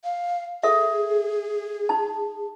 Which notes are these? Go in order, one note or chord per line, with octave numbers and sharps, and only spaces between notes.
F5
G#4 A4 E5
D#4 A5